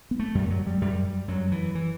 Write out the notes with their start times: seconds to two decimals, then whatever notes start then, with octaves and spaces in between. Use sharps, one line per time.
0.11 B3
0.19 A3
0.35 F#2 G3
0.50 F#3
0.67 G3
0.81 F#2 G3
1.28 F#2 F#3
1.52 E3
1.75 E3